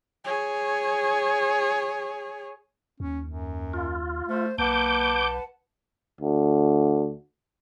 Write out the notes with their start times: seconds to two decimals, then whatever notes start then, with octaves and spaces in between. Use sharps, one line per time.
0.25 G#4 C#5
3.00 D#2 C#4
3.25 F#2
3.74 F4
4.28 A3 C5
4.58 B1 A#3 B4 F#5 A5 D6 G6
6.21 D2